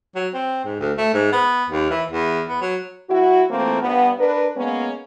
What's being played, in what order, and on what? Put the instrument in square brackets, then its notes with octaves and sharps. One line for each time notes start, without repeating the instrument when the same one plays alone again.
[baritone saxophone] F#3
C4
G#2
D2
A3
G#2
B3
D#2
E3
E2
B3
F#3
[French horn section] F#3 E4 F#4
E3 A3 A#3 C4 F4
G2 B3
D4 A#4 B4
G#3 A#3 B3 C#4